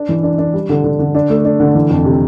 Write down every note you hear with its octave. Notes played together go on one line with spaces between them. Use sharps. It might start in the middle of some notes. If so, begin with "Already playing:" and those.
Already playing: D4
E3
D4
D4
G3
D3
D3
D3
D4
A3
D4
D3
E3
F2
C3